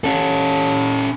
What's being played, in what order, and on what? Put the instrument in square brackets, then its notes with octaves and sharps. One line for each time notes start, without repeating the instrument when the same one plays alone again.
[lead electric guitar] C#4 A4